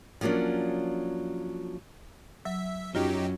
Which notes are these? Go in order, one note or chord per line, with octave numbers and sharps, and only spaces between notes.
F3 F#3 A#3 C#4 D4
F#3 E5
F#2 F#3 D#4 F4 G4